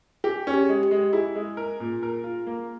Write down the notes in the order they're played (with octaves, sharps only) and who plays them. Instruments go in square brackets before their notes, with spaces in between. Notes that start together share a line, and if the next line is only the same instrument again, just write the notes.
[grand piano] G4 [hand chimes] G#4
[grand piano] C#4
[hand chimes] G4
[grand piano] G#3
[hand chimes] G4
[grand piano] G#3
[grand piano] E4 [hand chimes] G#4
[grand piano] G#3
A#4
A#2
A#4
F4
A#3